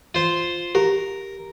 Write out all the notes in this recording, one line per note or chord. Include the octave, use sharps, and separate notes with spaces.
F4 C5
G4 A#4